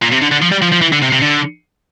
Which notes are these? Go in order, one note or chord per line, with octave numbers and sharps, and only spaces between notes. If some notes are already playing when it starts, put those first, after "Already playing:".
A#2
C3
D3
D3
F3
G3
F3
F3
E3
D3
C3
C3
D3